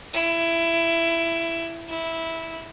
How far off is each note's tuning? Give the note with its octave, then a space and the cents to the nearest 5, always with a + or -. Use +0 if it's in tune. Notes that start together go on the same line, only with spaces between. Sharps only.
E4 +15
E4 -10